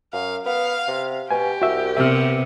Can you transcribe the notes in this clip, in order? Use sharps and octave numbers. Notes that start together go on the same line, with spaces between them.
F#2 F5
B3 F5
C3
B2 G4 G#5
C2 F#4 E5
C3 B3 E5 F6